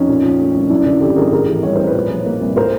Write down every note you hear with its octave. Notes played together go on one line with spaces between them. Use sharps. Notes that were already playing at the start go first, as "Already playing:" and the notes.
Already playing: F2 C#4 D#4
A#2
F3
A3
C2
F#2 D4 E4
D3 D4 E4
G#1 G4 A4
G#1 G#4 A#4
A2 G#4 A#4
E3
G3 C#5
A1 C5
B4 C#5
A#2
F3
A#3
C2
A2 A#4 C5